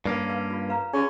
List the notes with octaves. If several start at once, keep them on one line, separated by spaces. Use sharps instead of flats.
G2 A#3 C#4
B4 F5
F4
B4 F5 A#5
C#4 F#4 G#4